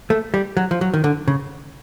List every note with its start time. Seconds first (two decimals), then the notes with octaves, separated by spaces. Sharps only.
0.10 A3
0.34 G3
0.57 F#3
0.71 F3
0.81 F#3
0.94 D#3
1.04 D3
1.28 C#3